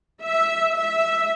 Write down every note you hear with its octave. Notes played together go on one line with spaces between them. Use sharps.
E5
E5